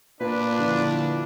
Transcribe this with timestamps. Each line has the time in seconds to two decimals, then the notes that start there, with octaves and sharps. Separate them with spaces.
0.21 A#2 D4 B4
0.58 D3 F3 E4